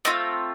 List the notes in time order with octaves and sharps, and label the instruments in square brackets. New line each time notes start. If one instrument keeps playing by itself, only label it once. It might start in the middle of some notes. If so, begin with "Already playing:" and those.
[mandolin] A3 C4 F4 D#5